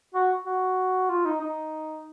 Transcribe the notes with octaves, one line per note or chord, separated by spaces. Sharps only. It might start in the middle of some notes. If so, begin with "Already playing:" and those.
F#4
F#4
F4
D#4
D#4